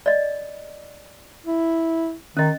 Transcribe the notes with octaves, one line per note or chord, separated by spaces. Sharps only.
D5 D#5
E4
D#3 C#4 D#5